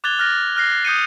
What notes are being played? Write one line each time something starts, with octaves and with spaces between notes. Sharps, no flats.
D6 F#6 G#6 A6 F7 G7
F6 F#6 A6 A#6
F6 F#6 A#6 C7
D#6 G6 C#7 D#7